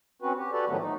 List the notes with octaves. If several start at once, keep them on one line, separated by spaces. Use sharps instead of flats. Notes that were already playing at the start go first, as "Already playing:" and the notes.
C4 C#4 F#4 B4
G4
F#4 G4 A4 B4 D5
A2 D#3 F3 F#3 A3 B3
D#4